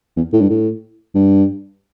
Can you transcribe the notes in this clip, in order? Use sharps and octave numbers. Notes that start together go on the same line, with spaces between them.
E2
A2
G2
A2
G2